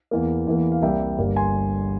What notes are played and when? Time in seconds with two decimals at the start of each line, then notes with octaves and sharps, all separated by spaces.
0.11 E2 E3 A#3
0.47 E2 E3 A#3
0.72 F5
0.82 C2 C3 G3 A#3 E5 G5
1.18 G1 G2 G3 A#3
1.36 G#5 C6